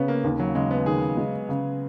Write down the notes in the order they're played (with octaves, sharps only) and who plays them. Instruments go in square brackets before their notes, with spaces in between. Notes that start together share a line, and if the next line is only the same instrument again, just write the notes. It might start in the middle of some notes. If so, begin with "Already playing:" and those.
Already playing: [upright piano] C#3 [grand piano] B3 C#4
[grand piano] A#3
[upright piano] D#2
[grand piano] F#3
[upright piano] C#3 [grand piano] G#3
[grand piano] B3
[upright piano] D#3 [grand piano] G#4
[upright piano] G#3
C#3